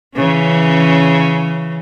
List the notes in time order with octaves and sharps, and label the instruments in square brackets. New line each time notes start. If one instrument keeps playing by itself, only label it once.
[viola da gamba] C#3 E3 C#4